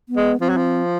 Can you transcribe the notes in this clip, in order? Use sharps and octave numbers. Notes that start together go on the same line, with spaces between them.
B3
G#3
F3 C4
F#3
F3